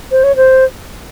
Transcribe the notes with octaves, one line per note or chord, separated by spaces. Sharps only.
C5
C#5
C5